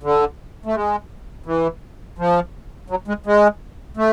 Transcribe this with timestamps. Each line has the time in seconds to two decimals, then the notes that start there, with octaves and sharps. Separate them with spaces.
0.03 D3
0.66 A3
0.75 G#3
1.46 E3
2.18 F3
2.90 F#3
3.08 G#3
3.26 G#3
3.97 A3